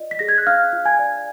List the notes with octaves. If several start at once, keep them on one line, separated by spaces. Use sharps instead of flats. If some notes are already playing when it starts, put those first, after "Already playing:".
Already playing: F4 D5 D#5
B6
G#4 A#6
G#6
F#6
D4 F5 F6
F4
G#5 G#6
D5